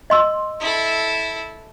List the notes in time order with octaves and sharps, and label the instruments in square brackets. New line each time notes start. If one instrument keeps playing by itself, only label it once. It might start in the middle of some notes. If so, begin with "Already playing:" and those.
[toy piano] D#5 C6 E6
[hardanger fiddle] E4 A4